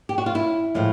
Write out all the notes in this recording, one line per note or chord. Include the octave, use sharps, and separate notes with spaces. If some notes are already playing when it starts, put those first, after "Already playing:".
G4
F#4
F4
E4
A2 F3 G#3